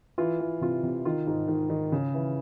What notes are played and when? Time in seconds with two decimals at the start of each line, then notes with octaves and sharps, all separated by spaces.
0.18 E3 F4
0.40 E3
0.61 C3 F4
0.83 C3
1.05 D#3 F4
1.27 G#2
1.48 D#3
1.70 D#3
1.92 C#3
2.14 E3